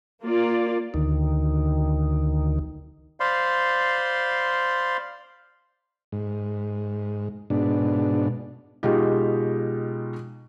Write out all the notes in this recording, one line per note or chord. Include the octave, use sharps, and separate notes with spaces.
A#3 F4 D5
D2 D#3
C5 D5 F5 B5 C6
G#2
G#2 B2 D4
B2 G#3 D#4 F4 G4